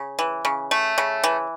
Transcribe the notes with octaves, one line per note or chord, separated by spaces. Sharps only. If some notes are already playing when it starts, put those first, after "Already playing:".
Already playing: C#3
E3
C#3
A3
C#3
E3